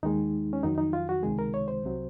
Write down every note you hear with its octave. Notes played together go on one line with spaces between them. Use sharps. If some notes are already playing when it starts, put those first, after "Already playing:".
D#2 D#3 G#3 D#4
C#4
F2 D#3 F#3 D#4
D#4
F4
F#4
C#2 C3 D#3 G#3 G#4
A#4
C#5
C5
C2 C3 F#3